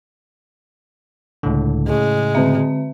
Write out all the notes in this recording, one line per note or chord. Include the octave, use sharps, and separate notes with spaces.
C#2 A2 D3
A2 C#3 G#3
D3 C4 E5